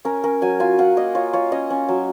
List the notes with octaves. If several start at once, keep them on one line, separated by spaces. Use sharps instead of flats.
C#4 A#4
C#4 A#4
F#3 G#5
F4 G#5
F4 F#5
A#3 D#5
F4 C#5
F4 C#5
C#4 D#5
C#4
F#3